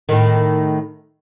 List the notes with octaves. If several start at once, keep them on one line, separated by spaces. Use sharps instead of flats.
A2 D#3